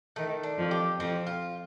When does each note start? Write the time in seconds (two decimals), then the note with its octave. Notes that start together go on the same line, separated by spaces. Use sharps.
0.16 D#3 A3
0.43 D4
0.58 F2 F3
0.71 G4
0.99 F2 F3 C4
1.27 F4